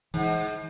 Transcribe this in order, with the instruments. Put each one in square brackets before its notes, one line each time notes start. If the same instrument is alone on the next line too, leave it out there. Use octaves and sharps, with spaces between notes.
[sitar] G#2 [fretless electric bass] E3